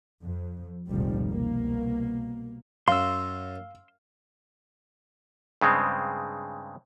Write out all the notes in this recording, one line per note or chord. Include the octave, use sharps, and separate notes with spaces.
F2
F1 C#2 A#2 D#3 F3 G3
C2 B2 A#3
F#2 F5 C6 E6
G2 C#3 G#3 C4